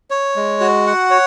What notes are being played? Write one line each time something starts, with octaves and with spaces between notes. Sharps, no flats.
C#5
G#3
F#4
F#5
C#5